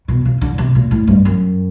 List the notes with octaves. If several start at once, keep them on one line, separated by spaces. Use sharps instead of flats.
B2
C#3
D3
C3
A#2
A2
G2
F#2